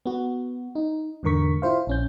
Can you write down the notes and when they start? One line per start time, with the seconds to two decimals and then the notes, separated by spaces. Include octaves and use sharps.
0.06 B3 F#4
0.75 D#4
1.23 E2 G#2 D3 A#4 C#6 B6
1.62 E4 F4 C5 F5
1.87 A#1 C#4 G6